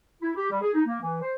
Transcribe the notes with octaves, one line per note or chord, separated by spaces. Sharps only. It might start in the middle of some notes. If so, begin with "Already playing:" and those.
E4
G4
G3
G#4
D#4
A#3
E3
C5